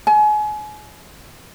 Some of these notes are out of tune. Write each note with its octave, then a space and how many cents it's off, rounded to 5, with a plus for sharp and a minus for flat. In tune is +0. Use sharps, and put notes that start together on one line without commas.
G#5 +35